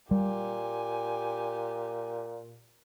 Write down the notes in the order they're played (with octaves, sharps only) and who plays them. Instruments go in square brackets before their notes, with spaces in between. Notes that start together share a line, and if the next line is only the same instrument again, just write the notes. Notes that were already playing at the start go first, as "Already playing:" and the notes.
[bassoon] A#2 [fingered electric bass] G3 [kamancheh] G4 G#5